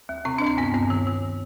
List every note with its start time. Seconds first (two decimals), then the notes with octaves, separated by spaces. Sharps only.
0.09 D#2
0.25 C3 C4
0.38 D2 D4
0.47 C4
0.58 G2 B3
0.74 G2 C4
0.90 D#3
1.07 D#3